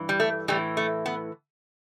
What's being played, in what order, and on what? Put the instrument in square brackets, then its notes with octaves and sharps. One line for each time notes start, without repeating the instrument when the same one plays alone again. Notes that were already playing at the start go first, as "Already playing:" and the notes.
Already playing: [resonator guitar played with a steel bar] G2 E3
G3
A3
A2 E3 G3
A3
B3